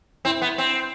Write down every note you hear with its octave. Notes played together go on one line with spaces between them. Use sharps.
C4 E4
B3
C4